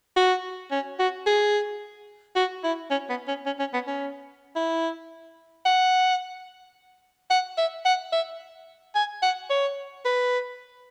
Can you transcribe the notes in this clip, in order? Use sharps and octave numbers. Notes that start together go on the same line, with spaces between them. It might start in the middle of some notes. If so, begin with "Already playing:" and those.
F#4
C#4
F#4
G#4
F#4
E4
C#4
B3
C#4
C#4
C#4
B3
C#4
E4
F#5
F#5
E5
F#5
E5
G#5
F#5
C#5
B4